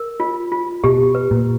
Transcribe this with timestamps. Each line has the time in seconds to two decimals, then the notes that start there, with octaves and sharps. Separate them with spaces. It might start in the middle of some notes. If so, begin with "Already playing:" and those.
Already playing: A#4
0.20 F4
0.52 F4
0.84 B2 G4
1.15 B4
1.31 A#2